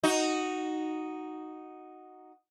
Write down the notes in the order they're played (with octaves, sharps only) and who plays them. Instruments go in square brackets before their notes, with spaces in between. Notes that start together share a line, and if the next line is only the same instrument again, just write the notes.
[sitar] D#4 F#4